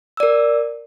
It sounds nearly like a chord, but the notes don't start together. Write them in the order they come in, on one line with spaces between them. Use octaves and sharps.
E6 D5 A#4